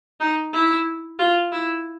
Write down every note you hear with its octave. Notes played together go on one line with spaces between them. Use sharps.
D#4
E4
F4
E4